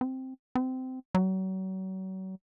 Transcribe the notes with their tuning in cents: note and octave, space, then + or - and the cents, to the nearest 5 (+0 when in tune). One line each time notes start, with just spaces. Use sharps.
C4 +0
C4 -20
F#3 +35